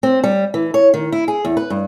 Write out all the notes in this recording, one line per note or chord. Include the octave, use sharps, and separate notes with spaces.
C4
G3
E3
C#5
D#3
E4
G#4
E2
B4
G2